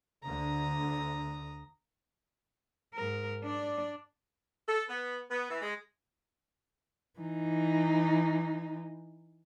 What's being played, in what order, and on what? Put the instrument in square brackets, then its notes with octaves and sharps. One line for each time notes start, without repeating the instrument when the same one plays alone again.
[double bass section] D2 D3 [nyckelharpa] A#5 D#6
[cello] G#2 A#4
D4 D5
[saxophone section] A4
B3
B3
E3
G#3
[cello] E3 D#4